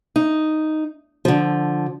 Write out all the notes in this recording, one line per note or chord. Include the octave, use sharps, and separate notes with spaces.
D#4
D3 F3